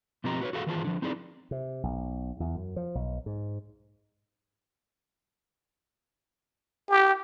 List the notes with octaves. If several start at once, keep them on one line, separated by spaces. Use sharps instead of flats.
B2 F3 C4 G4 D#5 A#5
F#4 B4 C#5
F#4 G#4 A4 F5 F#5
D#3 E3 F4 G#4 C5 A5
D3 F3
C4 D#4 E4 G#4 C#5 D5
C3
B1
E2
F#2
F3
B1
G#2
G4